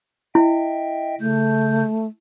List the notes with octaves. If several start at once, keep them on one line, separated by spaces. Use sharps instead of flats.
E4 D#5 E5 G5
C#3 A3 G6